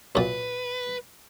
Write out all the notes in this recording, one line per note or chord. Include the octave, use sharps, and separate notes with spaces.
F#2 A#2 B4